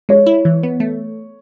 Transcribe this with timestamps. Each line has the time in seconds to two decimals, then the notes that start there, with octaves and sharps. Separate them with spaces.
0.09 G#3 C#5
0.27 E4
0.45 E3
0.63 B3
0.80 A3